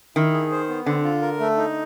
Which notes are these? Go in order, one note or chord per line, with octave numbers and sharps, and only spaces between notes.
D#3 E4
G#4
C5
B3
D3 C4
F4
A#4
A3
D#4